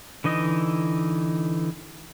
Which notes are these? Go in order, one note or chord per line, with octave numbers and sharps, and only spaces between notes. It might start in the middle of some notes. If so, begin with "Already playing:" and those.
D3 E3 D#4 D#5